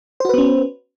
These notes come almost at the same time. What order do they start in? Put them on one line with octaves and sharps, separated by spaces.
C5 F#4 B4 B3 C#4